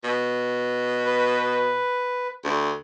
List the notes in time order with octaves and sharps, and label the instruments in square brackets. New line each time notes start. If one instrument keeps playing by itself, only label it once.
[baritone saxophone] B2
[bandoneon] B4
[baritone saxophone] D2